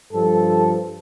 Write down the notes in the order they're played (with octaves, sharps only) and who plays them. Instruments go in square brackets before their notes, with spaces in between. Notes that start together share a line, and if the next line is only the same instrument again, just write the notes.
[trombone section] G2 F3 A4